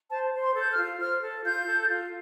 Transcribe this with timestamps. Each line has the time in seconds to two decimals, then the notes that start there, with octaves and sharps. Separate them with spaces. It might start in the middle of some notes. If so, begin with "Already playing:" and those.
0.10 C5 A5
0.33 C5
0.41 C6
0.55 A4 G6
0.70 F6
0.77 F4
1.00 C5 F6
1.23 A4
1.44 F4 G6
1.67 A4
1.88 F4